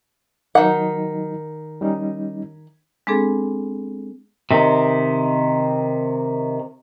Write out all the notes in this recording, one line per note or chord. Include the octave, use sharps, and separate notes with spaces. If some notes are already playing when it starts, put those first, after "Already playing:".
D#3 F#3 D#4 F#5
G3 C#4 D#4
G#3 B3 C4 D4 G#4 A4
C3 D#3